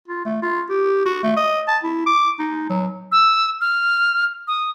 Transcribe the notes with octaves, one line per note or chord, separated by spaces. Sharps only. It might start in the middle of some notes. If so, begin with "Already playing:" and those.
F4
A3
F4
G4
F#4
A3
D#5
A5
E4
D6
D#4
F#3
E6
F6
D#6